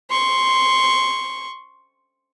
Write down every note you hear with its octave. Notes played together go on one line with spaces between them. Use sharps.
C6 C#6